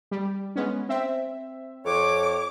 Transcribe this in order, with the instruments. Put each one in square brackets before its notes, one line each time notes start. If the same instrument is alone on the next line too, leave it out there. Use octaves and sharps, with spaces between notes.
[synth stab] G3 G4
G#3 B3 C#4
C4 E5
[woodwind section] F2 C#5 [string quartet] D6